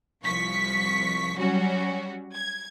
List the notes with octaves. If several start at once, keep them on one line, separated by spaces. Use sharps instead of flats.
C2 F3 C#6 B6
F#3 G3 C#4 F#4
G#6